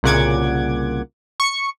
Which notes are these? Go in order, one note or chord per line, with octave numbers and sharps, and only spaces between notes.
C2 A#2 C#3 F#5 D6 G#6
C#6 C#7